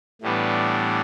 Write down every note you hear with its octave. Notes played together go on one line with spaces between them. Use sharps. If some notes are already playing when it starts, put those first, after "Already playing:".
A2 E3 G3 B3 D4